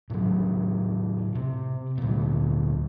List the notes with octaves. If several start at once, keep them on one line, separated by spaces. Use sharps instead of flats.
A2 C#3 F#3
C3
D2 A#2